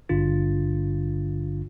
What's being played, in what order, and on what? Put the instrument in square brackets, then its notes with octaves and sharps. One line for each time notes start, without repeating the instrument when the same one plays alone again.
[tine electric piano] G#1 G2 D3 D4 F4 A6